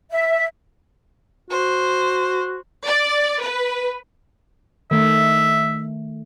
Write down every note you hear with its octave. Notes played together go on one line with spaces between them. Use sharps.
E5
F#4 C5
D5
B4
D#3 A3 E5